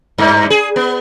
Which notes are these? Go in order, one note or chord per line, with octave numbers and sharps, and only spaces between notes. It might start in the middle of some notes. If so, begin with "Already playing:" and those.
G2
G#4
B3